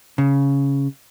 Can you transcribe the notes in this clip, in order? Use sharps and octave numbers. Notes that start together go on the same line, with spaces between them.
C#3